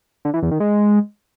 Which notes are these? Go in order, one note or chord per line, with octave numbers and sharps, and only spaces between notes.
D3
E3
E2
D#3
G#3